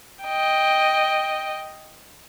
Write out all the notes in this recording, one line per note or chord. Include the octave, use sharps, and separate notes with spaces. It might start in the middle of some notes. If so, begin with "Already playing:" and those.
D#5 G5